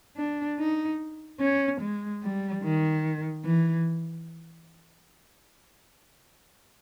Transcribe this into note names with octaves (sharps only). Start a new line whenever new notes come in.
D4
D#4
C#4
G#3
G3
D#3
E3